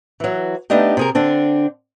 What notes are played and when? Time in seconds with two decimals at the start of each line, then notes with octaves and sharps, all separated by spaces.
0.20 E3 F#3
0.70 A3 B3 D4 D#4 G4
0.97 C3 G#4 A#4
1.15 D3 C4 D4